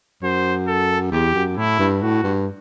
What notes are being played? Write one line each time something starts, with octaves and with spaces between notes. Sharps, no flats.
F#2 C5
A4
E2 G4
F#2
A2 E4
G2
A2 F#4
G2